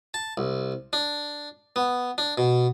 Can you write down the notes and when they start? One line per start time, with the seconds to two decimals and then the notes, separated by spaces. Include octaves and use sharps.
0.14 A5
0.37 C2
0.93 D4
1.76 B3
2.18 D4
2.38 B2